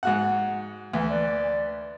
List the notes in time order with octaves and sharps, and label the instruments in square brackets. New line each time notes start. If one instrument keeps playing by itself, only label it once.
[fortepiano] G#2 F#4 F#5
[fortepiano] D2 [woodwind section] E3
[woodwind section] B4 D5